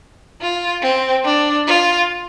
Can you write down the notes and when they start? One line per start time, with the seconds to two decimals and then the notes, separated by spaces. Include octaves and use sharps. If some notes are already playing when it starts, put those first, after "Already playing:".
0.41 F4
0.82 C4
1.25 D4
1.67 F4